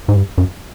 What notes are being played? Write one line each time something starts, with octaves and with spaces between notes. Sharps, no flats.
G#2
G2
F#2